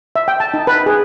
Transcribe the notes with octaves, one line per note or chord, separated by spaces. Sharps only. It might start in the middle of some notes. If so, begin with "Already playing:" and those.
E5
G5
A5
D#4
B4
G#4